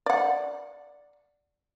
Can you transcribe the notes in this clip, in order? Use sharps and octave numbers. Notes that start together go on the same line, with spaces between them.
D5 F#5